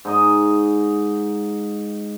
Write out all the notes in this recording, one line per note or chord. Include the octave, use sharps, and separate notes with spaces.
G#2 D#4 D#5